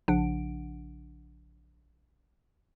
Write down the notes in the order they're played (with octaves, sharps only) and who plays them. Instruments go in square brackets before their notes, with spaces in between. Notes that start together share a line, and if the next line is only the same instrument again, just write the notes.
[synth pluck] A#1 C#3 F3 D4 F#5 D7